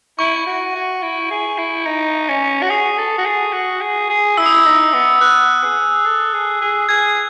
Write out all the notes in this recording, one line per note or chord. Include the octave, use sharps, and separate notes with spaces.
E4 C#6
F#4
F#4
E4
G#4
E4
D#4
C#4
F#4
G#4 D#6
A4
F#4
G#4
F#4
G#4
G#4
E4 E6
D#6
E6
D#4
B3
B3 F#6
G#4
A4
G#4
G#4
G#4 G#6